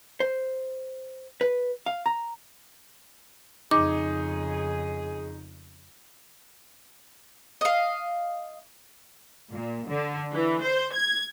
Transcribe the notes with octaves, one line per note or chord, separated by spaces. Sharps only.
C5
B4
F5
A#5
F2 C#3 D#4 G#4 D6
D#5 F5
A#2
D3
E3
C5
G#6